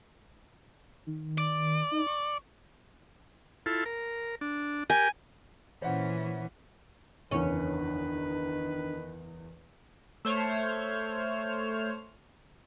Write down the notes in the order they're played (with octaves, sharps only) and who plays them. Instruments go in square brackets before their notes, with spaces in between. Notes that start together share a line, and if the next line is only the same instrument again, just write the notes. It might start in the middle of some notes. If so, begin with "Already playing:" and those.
[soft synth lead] D#3
[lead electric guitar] D5
[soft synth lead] D#4
C#6
[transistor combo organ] E4 F4 A4
A#4
D4
[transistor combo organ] G4 A#4 G5 [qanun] G#5
[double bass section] A#2 C#4 [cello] E3 [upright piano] C5 F#5
[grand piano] F#1 E2 [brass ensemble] D#3 B4 [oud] C#4 [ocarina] D4
[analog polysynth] A3 C5 C#5 F6